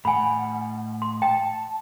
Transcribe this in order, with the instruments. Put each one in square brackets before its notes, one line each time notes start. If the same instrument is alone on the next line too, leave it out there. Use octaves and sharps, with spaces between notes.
[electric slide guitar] A2 F#5 [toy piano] G#5 B5
[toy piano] C6
[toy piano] G5 [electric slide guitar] A5